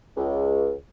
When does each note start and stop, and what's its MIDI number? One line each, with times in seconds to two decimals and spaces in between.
0.17 0.71 37